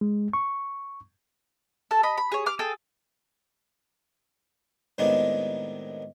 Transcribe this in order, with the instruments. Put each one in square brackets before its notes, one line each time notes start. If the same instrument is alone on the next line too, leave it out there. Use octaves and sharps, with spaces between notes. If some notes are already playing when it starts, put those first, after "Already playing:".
[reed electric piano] G#3
C#6
[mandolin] A4 A5
D#5 B5
B5
G#4 C#5
D6 F6
G#4 A4 G5
[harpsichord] A2 C3 D#3 G#3 B3 D4